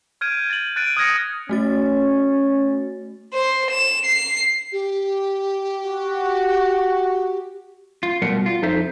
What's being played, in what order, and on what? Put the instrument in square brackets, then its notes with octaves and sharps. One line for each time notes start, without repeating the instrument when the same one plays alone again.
[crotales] F6 G6 G#6 D7 D#7
A6 F#7
F#6 A6 D7 D#7
D#6 F6 G#6 A#6 C#7
[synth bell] A3 F#4 A6 [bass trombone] C#4
[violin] C5
E7
C7
[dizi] G4
[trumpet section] F#4
[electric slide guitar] F4
B2 G3 A3 A#4 F#5
F4
F2 D#4 A4 C5 E5